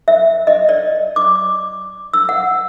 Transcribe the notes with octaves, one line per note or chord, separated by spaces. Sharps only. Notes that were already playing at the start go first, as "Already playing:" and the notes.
E5
D#5
D5
D6
E6
F#5